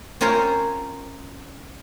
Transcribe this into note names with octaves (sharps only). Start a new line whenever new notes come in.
C4 C#4 F4 A#4 C5 C#5